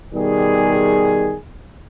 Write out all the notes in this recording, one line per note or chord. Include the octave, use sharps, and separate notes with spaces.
B2 D#3 G3 G#4